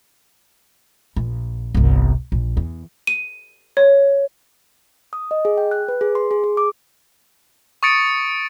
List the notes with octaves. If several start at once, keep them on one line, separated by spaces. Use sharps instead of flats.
A#1
G1 C2
A#1
E2
D#7
C#5
D#6
D#5
G#4
G5
F#6
B4
G#4
C6
G#4
G#4
D6
C#6 D#6 A6 C#7 D7